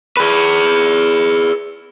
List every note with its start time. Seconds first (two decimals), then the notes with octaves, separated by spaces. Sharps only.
0.17 G#4 B4